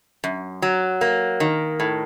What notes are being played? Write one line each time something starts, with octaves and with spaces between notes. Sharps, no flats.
F#2
F#3
A#3
D#3
A2